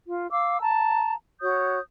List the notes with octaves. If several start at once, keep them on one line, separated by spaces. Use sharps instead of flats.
F4
F5 D6 E6
A5 A#5
F#4 C#5 D#6 G6